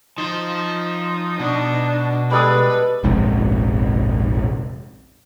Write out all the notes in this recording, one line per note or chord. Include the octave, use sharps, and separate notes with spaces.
F3 D#4 C5
B2 D4
G3 G#3 A4 B4 D#6
F1 A#1 G#2 C3